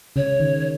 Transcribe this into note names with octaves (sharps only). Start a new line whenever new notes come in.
C#3 C#5
D#3